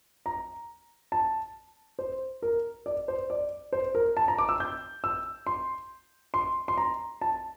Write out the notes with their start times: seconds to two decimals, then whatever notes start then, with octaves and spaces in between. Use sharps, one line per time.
0.26 A#5
1.12 A5
1.99 C5
2.42 A#4
2.86 D5
3.08 C5
3.30 D5
3.73 C5
3.95 A#4
4.17 A5
4.28 A#5
4.38 D6
4.49 E6
4.60 G6
5.04 E6
5.47 C6
6.34 C6
6.68 C6
6.78 A#5
7.21 A5